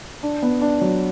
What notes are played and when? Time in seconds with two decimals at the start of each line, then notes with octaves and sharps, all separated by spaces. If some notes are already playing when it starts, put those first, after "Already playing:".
0.23 D4
0.43 B3
0.61 D4
0.81 F#3